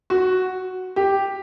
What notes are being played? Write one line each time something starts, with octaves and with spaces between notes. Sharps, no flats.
F#4
G4